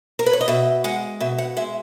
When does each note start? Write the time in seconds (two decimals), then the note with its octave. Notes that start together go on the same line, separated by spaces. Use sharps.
0.19 A#4
0.26 B4
0.33 C#5
0.41 D#5
0.48 B2 E5
0.84 G#3 F#5
1.20 B2 E5
1.38 F#5
1.57 G#3 E5